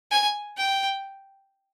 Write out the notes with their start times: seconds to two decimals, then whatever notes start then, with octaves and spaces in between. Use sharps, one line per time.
0.11 G#5
0.57 G5